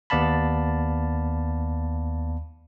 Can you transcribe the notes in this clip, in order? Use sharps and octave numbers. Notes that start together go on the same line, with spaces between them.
D#2 B3 D5 F5 A5 B5